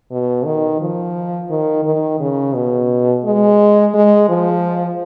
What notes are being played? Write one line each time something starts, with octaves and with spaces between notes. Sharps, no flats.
B2
D#3
F3
D#3
D#3
C#3
B2
G#3
G#3
F3